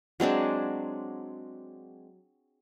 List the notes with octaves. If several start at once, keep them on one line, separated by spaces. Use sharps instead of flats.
F#3 G#3 C4 D4